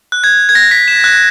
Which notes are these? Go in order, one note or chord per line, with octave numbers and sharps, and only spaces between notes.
F#6
G#6
G#6
A#6
B6
E7
F#6